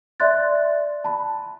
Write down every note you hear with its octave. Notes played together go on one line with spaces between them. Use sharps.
D5 E5 C6 F#6 A6
A5 B5